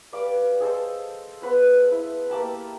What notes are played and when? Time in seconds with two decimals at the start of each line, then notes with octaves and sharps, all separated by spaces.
0.13 G3 B4 D5 F5
0.60 G#4 A4 C5 D#5
1.42 B3 B4 C5
1.91 E4
2.30 A#3 G4 A5 B5